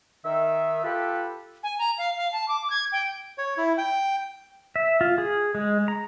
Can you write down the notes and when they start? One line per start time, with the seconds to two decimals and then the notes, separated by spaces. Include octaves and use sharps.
0.24 D#3 E5
0.84 F4 G4 A4 B4
1.63 G#5
1.79 A#5
1.98 F5
2.17 F5
2.33 A5
2.48 D6
2.70 G#6
2.92 G5
3.38 C#5
3.58 E4
3.78 G5
4.76 E5
5.01 F4
5.18 G#4
5.55 G#3
5.88 A#5